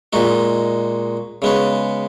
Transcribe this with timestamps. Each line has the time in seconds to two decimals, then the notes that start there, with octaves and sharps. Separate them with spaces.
0.13 A#2 G#3 D#4 F#4
1.42 C#3 G#3 B3 F#4